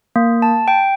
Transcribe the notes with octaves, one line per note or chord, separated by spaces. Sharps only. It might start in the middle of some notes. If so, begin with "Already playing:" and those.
A#3
A5
G5